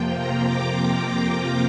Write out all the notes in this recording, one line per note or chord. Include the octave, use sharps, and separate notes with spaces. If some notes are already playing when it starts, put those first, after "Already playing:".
Already playing: F2 C3 F3 A#3 F4 G5
A#5
D6